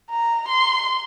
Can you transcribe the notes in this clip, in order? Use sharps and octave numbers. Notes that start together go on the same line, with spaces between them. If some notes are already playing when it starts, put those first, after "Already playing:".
A#5
C6